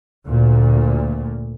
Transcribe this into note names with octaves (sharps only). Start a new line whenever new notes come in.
D2 A#2